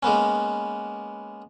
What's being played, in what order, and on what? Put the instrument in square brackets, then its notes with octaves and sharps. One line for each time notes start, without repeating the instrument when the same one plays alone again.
[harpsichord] G#3 A#3 B3 C#4